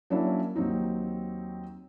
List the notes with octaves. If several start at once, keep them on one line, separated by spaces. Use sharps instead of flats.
F#3 A#3 C#4 D4 E4
D#2 F#3 C4 D#4